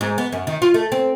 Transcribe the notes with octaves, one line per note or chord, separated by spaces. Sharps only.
G#2
B3
F#2
D#3
F4
A3
C4